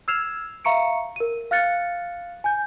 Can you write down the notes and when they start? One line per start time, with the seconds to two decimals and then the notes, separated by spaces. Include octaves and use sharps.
0.08 E6 F6 G#6 C7 E7 F7
0.65 E5 F5 A#5 C#6 C#7 D7
1.16 A#4 D#7
1.51 F5 F6 F#6 A6 C#7
2.44 G#5 G6